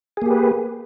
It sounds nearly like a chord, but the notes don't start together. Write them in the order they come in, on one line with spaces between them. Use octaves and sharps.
G#4 A#3 G4 B4